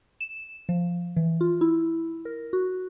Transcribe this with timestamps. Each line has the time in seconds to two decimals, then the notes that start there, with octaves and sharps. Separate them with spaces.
0.21 E7
0.69 F3
1.16 E3
1.41 F4
1.61 E4
2.25 A#4
2.53 F#4